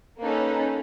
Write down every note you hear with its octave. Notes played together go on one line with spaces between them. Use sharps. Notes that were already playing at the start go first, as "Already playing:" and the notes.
A#3 C#4 D#4 A4 B4